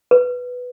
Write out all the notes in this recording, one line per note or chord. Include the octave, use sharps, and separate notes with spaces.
B4